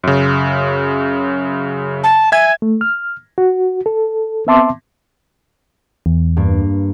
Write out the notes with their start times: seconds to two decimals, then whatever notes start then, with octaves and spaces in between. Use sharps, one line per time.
0.04 F#2 C#3
2.03 A5
2.32 E5 G#5 G#6
2.62 A3
2.81 F6
3.38 F#4
3.86 A4
4.47 B3 C4 E5 A5 C6 D6
6.06 E2
6.37 G2 A#3